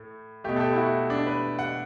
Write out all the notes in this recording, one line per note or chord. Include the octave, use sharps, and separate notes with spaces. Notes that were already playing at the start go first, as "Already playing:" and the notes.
Already playing: A2 A3
B2 A3 G4
A4
G4
E4
F#4
D4
B4
F#5